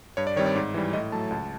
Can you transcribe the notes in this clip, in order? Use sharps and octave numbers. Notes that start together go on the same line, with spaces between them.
G2 C#5
D5
D#3 G3 C4 C#5
D5
G#2
E3 G3
A2 D#5
F#3 A3 A5
C#2